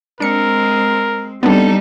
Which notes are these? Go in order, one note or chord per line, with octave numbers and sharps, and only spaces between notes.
G#3 C4 D4 A#4 C#7
G3 B3 C4 D4 D#4 A4